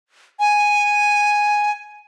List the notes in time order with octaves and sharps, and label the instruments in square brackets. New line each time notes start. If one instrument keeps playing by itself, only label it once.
[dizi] G#5